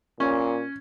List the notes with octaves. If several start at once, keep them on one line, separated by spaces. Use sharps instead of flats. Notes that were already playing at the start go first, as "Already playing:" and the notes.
A#2 C#4